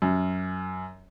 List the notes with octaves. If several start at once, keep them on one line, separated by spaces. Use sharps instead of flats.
F#2